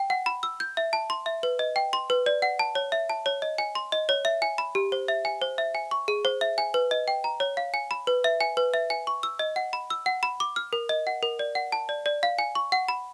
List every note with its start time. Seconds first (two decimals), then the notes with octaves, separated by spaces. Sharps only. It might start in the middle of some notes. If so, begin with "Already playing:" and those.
Already playing: G5
0.10 F#5
0.26 B5
0.43 E6
0.60 G6
0.77 E5
0.93 A5
1.10 C6
1.26 E5
1.43 B4
1.59 D#5
1.76 G5
1.93 C6
2.10 B4
2.26 D5
2.42 F#5
2.59 A5
2.75 C#5
2.92 E5
3.09 A5
3.26 C#5
3.42 D#5
3.58 G#5
3.75 C6
3.92 D#5
4.09 C#5
4.25 E5
4.42 G#5
4.58 B5
4.75 G4
4.92 C5
5.08 E5
5.25 G#5
5.42 C5
5.58 E5
5.75 G#5
5.91 C#6
6.08 G#4
6.25 C5
6.41 E5
6.58 G#5
6.74 B4
6.91 D#5
7.08 G5
7.24 A#5
7.40 C#5
7.57 F5
7.74 G#5
7.91 B5
8.07 B4
8.24 E5
8.41 G#5
8.57 B4
8.74 E5
8.90 G#5
9.07 C#6
9.23 E6
9.39 D#5
9.56 F#5
9.73 B5
9.90 E6
10.06 F#5
10.23 B5
10.40 D6
10.56 F6
10.73 A#4
10.89 D#5
11.07 F#5
11.23 A#4
11.39 D5
11.55 F#5
11.72 A5
11.89 D5
12.06 D5
12.23 F5
12.38 G#5
12.55 C#6
12.72 F#5
12.88 B5